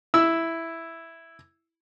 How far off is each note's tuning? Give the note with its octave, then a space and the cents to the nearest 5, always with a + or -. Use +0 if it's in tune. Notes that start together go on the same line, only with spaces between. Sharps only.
E4 +0 E6 +0